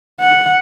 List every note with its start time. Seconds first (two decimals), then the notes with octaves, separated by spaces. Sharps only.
0.21 F#5